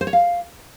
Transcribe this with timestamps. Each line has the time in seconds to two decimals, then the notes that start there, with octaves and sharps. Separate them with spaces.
0.01 C5
0.07 C#5
0.13 F5